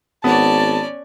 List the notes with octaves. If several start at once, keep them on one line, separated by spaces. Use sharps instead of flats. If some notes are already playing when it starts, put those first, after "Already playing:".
G#1 B3 C#4 D5 A5